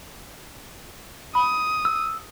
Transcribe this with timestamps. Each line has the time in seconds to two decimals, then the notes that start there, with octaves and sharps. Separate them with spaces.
1.35 B5 D#6
1.85 E6